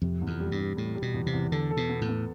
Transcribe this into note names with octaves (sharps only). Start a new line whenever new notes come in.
F2 C3
E2
F2
G3
G2
G3
A2 G3
G3
B2
E2
C3
E2
D3 A4
A4
B2
B3
A2
B3